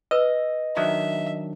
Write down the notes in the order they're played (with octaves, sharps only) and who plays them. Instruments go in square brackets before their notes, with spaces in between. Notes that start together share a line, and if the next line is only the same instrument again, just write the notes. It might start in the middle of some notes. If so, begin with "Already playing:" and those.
[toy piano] B4 E6 [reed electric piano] D#5
[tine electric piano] D#3 F#3 D4 [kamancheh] E5